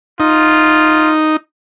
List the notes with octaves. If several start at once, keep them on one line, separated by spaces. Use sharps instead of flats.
D#4 F4